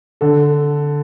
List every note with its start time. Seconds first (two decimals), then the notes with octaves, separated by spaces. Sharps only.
0.21 D3 A4